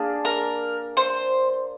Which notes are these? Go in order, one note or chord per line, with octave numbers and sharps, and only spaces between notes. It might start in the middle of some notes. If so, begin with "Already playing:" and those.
Already playing: A#3 D4 G#4
A#4
C5